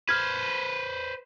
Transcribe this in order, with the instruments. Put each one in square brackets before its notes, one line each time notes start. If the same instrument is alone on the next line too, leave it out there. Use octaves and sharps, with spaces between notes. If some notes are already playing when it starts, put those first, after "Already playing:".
[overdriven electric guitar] B4 C5 [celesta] F6 G#6